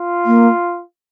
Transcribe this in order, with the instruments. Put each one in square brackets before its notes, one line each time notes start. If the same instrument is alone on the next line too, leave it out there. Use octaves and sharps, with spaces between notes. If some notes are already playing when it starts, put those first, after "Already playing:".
Already playing: [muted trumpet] F4
[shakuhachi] A#3